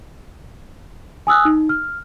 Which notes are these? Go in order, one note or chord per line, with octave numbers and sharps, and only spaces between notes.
G#5 D#6 E6 F#6
D#4
F6